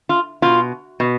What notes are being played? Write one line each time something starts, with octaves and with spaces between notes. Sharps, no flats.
F4
B2 F4
B2